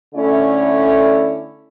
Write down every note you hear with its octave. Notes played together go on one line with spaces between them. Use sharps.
D3 A3 C#4 E4 D5